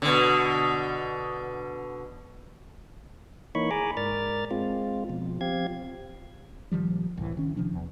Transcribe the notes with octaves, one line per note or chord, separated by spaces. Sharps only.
B2 D3
E3 A#3 D#4 C#5 B5 C#6
G#4 G#5 A#5 B5 D6
G#2 A#4 D5 F6 A6
G#3 C4 F4
B2 F3
F3 C4 G4 F5 G#6
A#1 D#3 F3 G3
C2 A2 E3
D#3 C#4
C3 D#3 F3 D4
E2